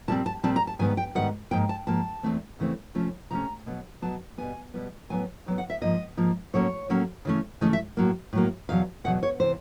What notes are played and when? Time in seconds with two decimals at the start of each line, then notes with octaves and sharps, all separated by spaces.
0.08 A#2 G3 C4 A5
0.26 A5
0.44 A#2 G3 C4 A5
0.56 A#5
0.67 A5
0.79 G#2 D#3 G3 B3 G#5
0.97 G5
1.15 G#2 D#3 G3 B3 F#5
1.51 G#2 F3 A#3 G5
1.69 A5
1.87 G#2 F3 A#3 A5
2.23 E2 C#3 E3 A3 C4
2.59 E2 C#3 E3 A3 C4
2.95 C3 F3 A3 C#4
3.31 C3 F3 A3 C#4 A#5
3.66 B2 F#3 B3
4.02 B2 F#3 B3 A5
4.38 B2 G3 B3 G#5
4.74 B2 G3 B3
5.10 A2 F#3 B3 G#5
5.46 A2 F#3 B3
5.58 F#5
5.70 E5
5.81 G#2 F3 A#3 D#5
6.17 G#2 F3 A#3
6.53 A2 F#3 A#3 C#4 C#5
6.89 A2 F#3 A#3 C#4
7.25 C#3 E3 A3 C#4
7.61 C#3 E3 A3 C#4 D#5
7.73 E5
7.97 A2 F#3 A#3
8.33 A2 F#3 A#3
8.69 E2 B2 F#3 F5
9.04 E2 B2 F#3 F#5
9.23 C#5
9.40 C3 E3 C5